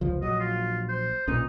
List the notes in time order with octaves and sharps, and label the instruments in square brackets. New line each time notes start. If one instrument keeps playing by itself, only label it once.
[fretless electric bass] F1 C#2 F3
[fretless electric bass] A#1 F#3 [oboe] D#5
[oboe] F4
C5
[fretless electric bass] B1 A#2 C#4 [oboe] D#4